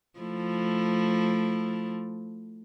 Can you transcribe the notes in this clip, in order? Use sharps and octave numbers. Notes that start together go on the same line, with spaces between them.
F3 A3 E4